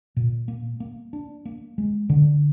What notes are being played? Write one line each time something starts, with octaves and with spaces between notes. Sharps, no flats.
A#2
A#3
A#3
D4
A#3
G#3
D3